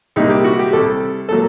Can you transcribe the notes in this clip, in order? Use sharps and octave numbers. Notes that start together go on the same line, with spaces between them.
C2 A#2 G3 A#3 D#4
G4
F#4
G4
C2 C3 G3 A4
A#2 F#3 A#3 A4